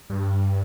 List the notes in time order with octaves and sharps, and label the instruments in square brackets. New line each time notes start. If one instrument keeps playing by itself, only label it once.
[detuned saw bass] G2